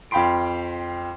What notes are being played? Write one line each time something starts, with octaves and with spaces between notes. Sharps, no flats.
F2 F5 G5 B5 C6 D7